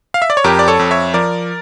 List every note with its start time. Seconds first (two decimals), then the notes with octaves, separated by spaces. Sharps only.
0.14 F5
0.22 E5
0.30 D5
0.37 C#5
0.44 F2 G4 A#4
0.59 D5
0.68 A4 C#5
0.79 F2
0.91 C#5 E5
1.14 F3 A#4 D5